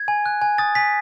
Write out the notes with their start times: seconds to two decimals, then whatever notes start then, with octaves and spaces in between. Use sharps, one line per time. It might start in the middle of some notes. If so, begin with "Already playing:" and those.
Already playing: G#6
0.08 G#5
0.26 F#6
0.42 G#5
0.58 D#6 A6
0.75 G#5 B6